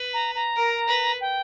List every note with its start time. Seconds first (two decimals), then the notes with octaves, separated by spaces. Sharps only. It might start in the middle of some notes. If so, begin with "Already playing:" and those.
Already playing: B4
0.14 A#5
0.35 A#5
0.56 A#4
0.89 B4
1.21 G5